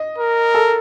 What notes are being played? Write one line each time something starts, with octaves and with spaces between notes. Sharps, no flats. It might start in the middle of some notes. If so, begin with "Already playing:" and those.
Already playing: D#5
A#4
A4